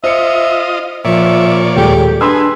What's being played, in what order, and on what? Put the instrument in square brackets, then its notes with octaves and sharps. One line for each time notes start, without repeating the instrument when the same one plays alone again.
[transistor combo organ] F4 D#5 [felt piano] C5 C#7 [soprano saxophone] E5
[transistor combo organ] A#2 C#5 D5 [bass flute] F3 [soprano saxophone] E5
[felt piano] D#1 G#3 A4 [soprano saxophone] G4
[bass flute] D4 [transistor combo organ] G#4 [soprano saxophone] B4 [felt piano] C6 E6